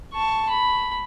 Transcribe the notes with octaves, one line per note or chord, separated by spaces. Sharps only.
A5 C#6
B5